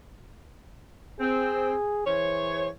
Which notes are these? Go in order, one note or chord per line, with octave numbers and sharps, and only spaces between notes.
C4 G#4
E3 G#4 C5 C#5